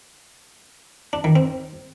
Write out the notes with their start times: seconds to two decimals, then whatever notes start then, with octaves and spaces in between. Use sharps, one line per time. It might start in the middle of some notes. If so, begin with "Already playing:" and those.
1.13 D4
1.24 D#3
1.36 C4